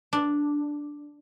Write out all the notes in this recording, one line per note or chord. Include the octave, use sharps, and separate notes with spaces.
D4